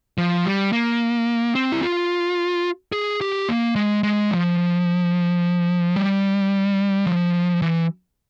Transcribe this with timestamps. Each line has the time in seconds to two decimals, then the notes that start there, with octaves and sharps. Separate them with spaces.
0.18 F3
0.45 G3
0.72 A#3
1.55 C4
1.72 E4
1.82 F4
2.92 G#4
3.21 G4
3.49 A#3
3.76 G#3
4.03 G#3
4.31 F3
5.96 G3
7.06 F3
7.62 E3